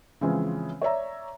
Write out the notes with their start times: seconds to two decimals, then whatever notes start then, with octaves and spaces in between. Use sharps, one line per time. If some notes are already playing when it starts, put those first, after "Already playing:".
0.21 C#3 E3 F3 G#3 C4 C#4
0.81 C#5 D5 E5 A#5